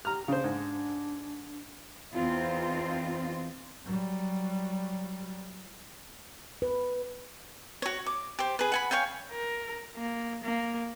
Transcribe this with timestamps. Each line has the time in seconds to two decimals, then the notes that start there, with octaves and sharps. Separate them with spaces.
0.05 G4 A#5 F6
0.28 C#3 D4 C5
0.44 G#2
2.14 E2 C4 D#4 F4 C5
3.84 F#3 G3
6.62 B4
7.82 F#4 C#5
8.06 D6
8.39 G4 C5
8.59 G#4 B4
8.72 F#5 G#5 B5
8.91 C#5 F5 G5 G#5
9.31 A#4
9.96 A#3
10.44 A#3